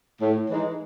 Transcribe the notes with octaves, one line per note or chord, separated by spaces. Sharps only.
A2
E3 G#3 D#4